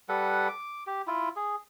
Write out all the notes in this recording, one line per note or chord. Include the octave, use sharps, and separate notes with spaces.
G3 A4 B4 F#5
D6
G4
E4 F4
G#4